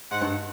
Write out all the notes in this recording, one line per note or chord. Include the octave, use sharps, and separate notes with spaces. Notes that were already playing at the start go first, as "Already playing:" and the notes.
G#2 F#5
G2